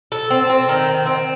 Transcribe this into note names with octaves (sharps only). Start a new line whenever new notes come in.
A4
C4
C4
D#3
C4
C4